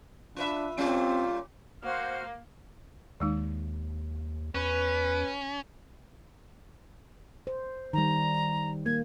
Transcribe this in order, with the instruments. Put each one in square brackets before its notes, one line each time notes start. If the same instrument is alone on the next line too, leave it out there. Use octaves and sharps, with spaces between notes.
[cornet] D4 [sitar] F4 B4 E5
[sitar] A#2 G3 C#4 [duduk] C4 [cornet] F4
[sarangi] A#3 [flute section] F#4 C5 F6
[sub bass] D#2 [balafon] D#3 G#3 D#4
[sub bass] E2 [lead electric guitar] C#4 [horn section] B4
[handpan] C5
[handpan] D#3 G3 [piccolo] A#5
[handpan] A#3 [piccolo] G#6